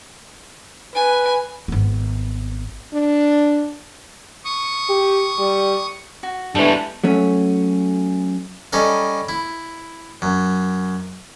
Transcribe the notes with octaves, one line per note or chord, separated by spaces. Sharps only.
B4 G#5
G#1 B3
D4
C#6 D#6
G4
G3
F#4
E3 G3 G#3 B3 D4 A4 C#5
F#3 A3 C#4
G3 C#4 D#4 A4 F5
E4
F#2